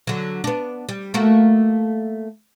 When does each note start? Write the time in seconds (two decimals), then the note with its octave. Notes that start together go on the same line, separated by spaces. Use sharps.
0.07 D3 F#3
0.44 B3 D4
0.89 G3
1.14 A3 A#3 F#4